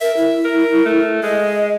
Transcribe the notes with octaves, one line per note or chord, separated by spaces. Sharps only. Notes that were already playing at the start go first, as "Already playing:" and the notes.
A#4 E5
E4
A#4
A3
G#3 D#5